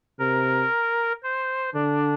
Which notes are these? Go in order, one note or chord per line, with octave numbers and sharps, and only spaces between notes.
C3 A#4
C5
D3 D4